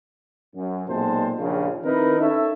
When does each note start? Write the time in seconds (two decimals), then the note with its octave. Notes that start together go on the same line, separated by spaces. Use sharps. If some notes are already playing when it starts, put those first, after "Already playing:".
0.56 F#2
0.89 B1 A#2 G#3 C4 C5 A5
1.39 A#1 D#2 C#3
1.84 D#3 C4 D#4 E4 A#4 B4
2.19 C#4 D#4 A4 C#5 E5